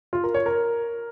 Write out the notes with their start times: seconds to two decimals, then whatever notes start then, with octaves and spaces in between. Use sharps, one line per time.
0.13 F4
0.24 A#4
0.34 C#5
0.46 A#4